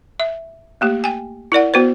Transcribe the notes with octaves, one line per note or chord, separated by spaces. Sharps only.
E5
A3 A#3 G4
G5 G#5
E4 A#4 D5 F#5
B3 F#4 B4 C5